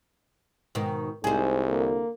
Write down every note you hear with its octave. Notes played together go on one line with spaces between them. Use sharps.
G#2 B2 D#3
C2 G#2 G#4 C5
D3 A#3